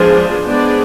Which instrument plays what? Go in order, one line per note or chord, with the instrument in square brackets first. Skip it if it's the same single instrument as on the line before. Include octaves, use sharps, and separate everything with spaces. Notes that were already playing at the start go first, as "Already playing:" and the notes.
Already playing: [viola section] F3 G#3 B3 D4 G#4 [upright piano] C5
[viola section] G#3 B3 D4 G#4 D5